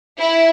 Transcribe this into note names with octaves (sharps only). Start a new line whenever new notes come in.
E4